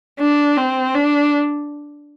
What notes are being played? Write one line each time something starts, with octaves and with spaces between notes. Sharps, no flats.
D4
C4
D4